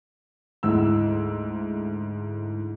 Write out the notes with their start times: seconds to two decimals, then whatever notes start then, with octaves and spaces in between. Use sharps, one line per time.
0.63 D2 G#2 E4 E6